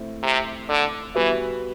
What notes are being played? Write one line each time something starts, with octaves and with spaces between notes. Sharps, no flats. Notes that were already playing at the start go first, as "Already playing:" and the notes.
Already playing: A3 C4 E4
C3
D3
E3 G3 B3 F#4 B4 E5